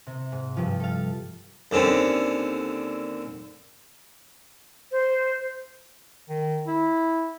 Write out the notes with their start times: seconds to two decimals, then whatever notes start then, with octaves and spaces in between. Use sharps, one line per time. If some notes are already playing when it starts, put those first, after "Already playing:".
0.07 C3
0.32 G#2
0.57 G2 F3
0.80 A4 F5
1.71 D#2 D3 C4 C#4
4.92 C5
6.29 D#3
6.67 E4